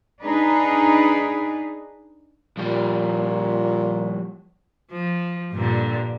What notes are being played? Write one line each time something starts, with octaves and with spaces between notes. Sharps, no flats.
D4 D#4 G#4 B4
A#2 F3 G3 G4
F3
G2 A#2 D3